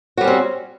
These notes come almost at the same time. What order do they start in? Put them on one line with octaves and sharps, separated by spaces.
F#4 G3 C#4 C4